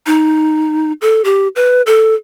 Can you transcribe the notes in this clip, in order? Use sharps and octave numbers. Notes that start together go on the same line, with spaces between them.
D#4
A4
G4
B4
A4